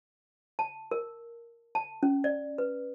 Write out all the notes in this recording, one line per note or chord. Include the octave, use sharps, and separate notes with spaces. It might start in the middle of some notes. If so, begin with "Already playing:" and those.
A5
A#4
A5
C#4
D5
B4